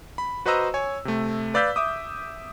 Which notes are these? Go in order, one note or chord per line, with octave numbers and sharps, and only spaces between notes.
B5
F#4 B4 C5 D#5 A#5 E6
C#5 G#5
C3 A3
B4 D5 F5 E6 G6 B6
E5 D6 D#6